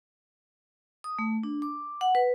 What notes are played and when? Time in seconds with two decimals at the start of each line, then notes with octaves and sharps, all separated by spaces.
1.04 D#6
1.19 A3
1.43 D4
1.62 D6
2.01 F#5
2.15 B4